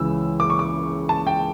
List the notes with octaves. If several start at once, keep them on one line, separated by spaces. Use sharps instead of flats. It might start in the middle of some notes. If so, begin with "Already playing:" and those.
Already playing: C#2 C#3 E3 E6
D6
C#6
D6
A5
G5